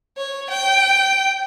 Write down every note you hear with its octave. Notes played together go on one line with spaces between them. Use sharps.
C#5
G5